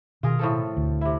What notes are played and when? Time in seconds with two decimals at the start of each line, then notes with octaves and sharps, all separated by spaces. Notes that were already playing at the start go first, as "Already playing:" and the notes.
0.23 B2 D#3 F4 G#4 A#4
0.39 A2 F3 A4
0.77 D2
1.01 C3 E4